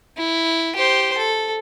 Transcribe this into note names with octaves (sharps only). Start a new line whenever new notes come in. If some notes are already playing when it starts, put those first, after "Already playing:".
E4
G4 C5
A4